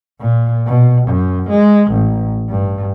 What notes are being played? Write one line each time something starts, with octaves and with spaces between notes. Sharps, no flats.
A#2
B2
F#2
G#3
A1
G2